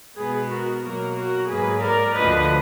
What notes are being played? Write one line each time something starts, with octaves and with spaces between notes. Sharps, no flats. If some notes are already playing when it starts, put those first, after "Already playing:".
B2 G#3 B3 G#4 B4
F#4 A#4
B2 F#3 A#3 F#4 A#4
F#4 A#4
G#2 F#3 A#3 G#4 B4
A#4 D5
D2 D3 F3 B4 D#5